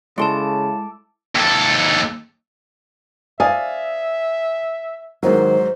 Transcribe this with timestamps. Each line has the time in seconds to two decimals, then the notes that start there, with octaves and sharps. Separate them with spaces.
0.18 C#3 G#3 E4 A4 D5 A5 C6
1.35 D#2 A4
3.40 C5 D5 E5 F5 G#5 D#6
5.23 G#2 D#3 F#3 C5